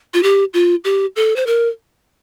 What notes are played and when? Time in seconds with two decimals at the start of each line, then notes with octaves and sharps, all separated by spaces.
0.14 F4
0.23 G4
0.54 F4
0.84 G4
1.16 A4
1.36 C5
1.47 A#4